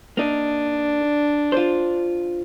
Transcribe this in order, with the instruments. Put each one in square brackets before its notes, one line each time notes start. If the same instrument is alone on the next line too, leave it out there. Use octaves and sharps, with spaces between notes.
[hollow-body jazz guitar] A#3 D#4 [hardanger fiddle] D4
[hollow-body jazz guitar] F4 C5